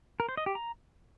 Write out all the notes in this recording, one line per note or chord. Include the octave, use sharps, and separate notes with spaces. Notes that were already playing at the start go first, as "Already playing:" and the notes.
A#4
C5
D#5
G4
A#5